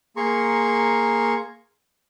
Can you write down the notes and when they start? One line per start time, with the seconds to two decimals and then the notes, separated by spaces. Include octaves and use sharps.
0.17 A#3 G#4 A#5 C6 C#6